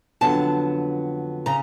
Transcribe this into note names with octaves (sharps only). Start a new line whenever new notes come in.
F2 D3 F#3 B3 A5
C#3 A#5